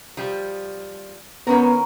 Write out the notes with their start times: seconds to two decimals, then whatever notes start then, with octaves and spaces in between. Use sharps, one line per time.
0.17 F3 G3
1.47 D#3 B3 C#4 A#4